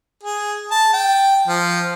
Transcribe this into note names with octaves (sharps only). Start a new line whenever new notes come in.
G#4
A5
G5
F3